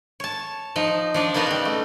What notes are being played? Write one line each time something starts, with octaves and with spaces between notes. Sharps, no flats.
C#5 A5
F3 D#4
F3 D4 D5
A#3 B3 D#4 F4 F#4
C#3 G3
A3